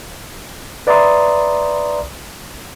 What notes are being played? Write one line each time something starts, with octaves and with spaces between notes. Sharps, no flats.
B4 D5 E5 A#5 C6 D#6